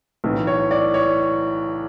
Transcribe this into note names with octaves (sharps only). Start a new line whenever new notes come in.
B1 A2 E3
C#5
D5
C#5